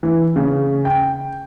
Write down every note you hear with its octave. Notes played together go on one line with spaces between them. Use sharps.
E3
C#3
G5